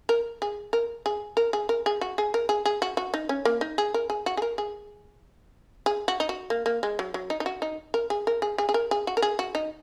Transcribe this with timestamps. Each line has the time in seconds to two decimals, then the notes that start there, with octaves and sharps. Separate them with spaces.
0.09 A#4
0.42 G#4
0.73 A#4
1.06 G#4
1.37 A#4
1.53 G#4
1.69 A#4
1.86 G#4
2.01 F#4
2.18 G#4
2.34 A#4
2.49 G#4
2.65 G#4
2.82 F#4
2.97 F#4
3.14 D#4
3.29 C#4
3.45 A#3
3.61 D#4
3.78 G#4
3.94 A#4
4.10 G#4
4.26 F#4
4.37 G#4
4.42 A#4
4.58 G#4
5.86 G#4
6.08 F#4
6.20 D#4
6.29 F#4
6.50 A#3
6.66 A#3
6.83 G#3
6.99 F#3
7.14 F#3
7.30 D#4
7.40 D#4
7.46 F#4
7.62 D#4
7.94 A#4
8.10 G#4
8.27 A#4
8.42 G#4
8.58 G#4
8.69 G#4
8.74 A#4
8.91 G#4
9.07 F#4
9.17 A#4
9.22 G#4
9.39 F#4
9.55 D#4